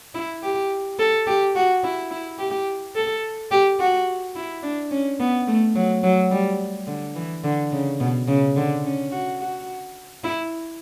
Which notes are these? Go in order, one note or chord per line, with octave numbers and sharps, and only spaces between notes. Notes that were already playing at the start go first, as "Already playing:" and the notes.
E4
G4
A4
G4
F#4
E4
E4
G4
A4
G4
F#4
E4
D4
C#4
B3
A3
F#3
F#3
G3
D3
E3
D3
C#3
B2
C#3
D3
C#4
F#4
F#4
E4